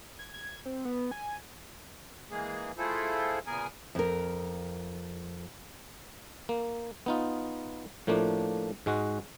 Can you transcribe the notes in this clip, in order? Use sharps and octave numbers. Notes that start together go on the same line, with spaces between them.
G#6
G#6
C4
B3
G#5
E3 G#3 A#3 G#4
A3 E4 F4 G#4 A4 C5
A#2 C#3 B3 G#4 A#4 G#5
F2 A#4
A#3
B3 D#4 F4
A2 F3 A3 A#3 D4
G#2 G#3 F#4